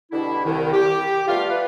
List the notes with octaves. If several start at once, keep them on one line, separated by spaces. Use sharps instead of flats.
B2 D3 G3 E4
C2 D#3
G4
G3 A3 B3 F4 F5
B4